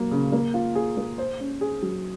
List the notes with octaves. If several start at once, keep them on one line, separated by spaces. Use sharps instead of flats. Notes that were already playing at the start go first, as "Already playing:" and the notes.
Already playing: F#3 A#3
C#3
A#3
F4
G#4
A#3
C5
C#4
G#4
F#3